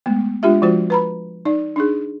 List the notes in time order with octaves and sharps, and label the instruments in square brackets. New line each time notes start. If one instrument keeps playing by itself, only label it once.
[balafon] G#3 A3 B3
G#3 D4 F4 G4 E5
F3 G#3 F4 F#4 C5
B4 A#5 B5
D#4 D5
D4 D#4 G#4